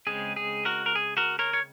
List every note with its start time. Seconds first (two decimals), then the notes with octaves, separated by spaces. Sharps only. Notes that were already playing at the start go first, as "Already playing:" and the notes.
0.07 C#3 G#3 C4 G#4
0.36 G#4
0.65 F#4 A#4
0.86 A#4
0.95 G#4
1.17 F#4 A#4
1.39 A#4 C#5
1.53 C#5